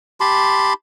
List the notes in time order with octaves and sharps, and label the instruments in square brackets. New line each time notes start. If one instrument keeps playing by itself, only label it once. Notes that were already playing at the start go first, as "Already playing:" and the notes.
[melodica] G4 A5 B5 C6